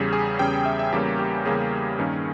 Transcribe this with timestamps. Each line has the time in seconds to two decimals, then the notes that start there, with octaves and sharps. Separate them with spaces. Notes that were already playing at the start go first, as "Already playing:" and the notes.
Already playing: E2 C#3 G3 C#4 G#4
0.13 G#4
0.39 E2 C#3 G3 C#4 G5
0.65 E5
0.79 E5
0.92 E2 C#3 G3 A#3 C#4 G4
1.19 G4
1.45 E2 C#3 G3 A#3 C#4 G#4
1.99 G2 D#3 A#3 C#4